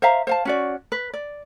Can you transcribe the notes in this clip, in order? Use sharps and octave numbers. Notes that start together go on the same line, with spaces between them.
C5 E5 F5 A#5
C5 F5 A5
C#4 F#4 D5
B4
D5